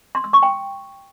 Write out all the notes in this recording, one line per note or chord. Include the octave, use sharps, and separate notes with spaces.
C6
E6
C#6
G5